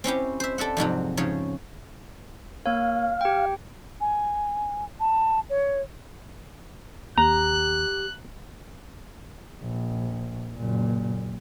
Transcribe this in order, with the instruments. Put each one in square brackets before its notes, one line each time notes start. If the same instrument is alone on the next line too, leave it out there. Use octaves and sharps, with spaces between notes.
[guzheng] C4 C#4 E4 G4
C5 E5
A4 D5 E5 F#5
F2 G#2 C3 F#3
G#2 C#3 F3 C#5
[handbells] A#3 C#5 [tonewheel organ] F5
[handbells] G4 G5
[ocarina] G#5
A5
C#5
[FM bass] D#2 [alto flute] G4 [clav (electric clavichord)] A#5 [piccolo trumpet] F#6
[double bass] A#1
F#1 A#2